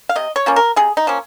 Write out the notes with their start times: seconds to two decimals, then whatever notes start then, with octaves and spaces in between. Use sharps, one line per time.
0.09 F5
0.16 C3 D#5
0.36 C#5
0.46 F3 A#3 C#4
0.56 A#4
0.76 C3 G#4
0.97 D#4
1.07 F3 A#3 C#4